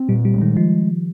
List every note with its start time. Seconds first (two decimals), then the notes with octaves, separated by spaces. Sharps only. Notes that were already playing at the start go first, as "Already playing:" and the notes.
Already playing: C4
0.09 A#2 G3
0.25 G3
0.34 G#3
0.42 D#3
0.57 F3